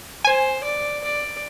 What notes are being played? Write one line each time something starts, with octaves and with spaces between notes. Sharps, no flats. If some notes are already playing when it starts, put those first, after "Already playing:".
C5 G#5
D5
D5